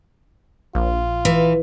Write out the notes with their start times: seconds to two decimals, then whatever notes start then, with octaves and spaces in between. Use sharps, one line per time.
0.75 A#1 F4
1.25 E3